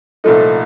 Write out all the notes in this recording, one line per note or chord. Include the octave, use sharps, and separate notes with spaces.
C2 A#2 F3 A3 D#4 A4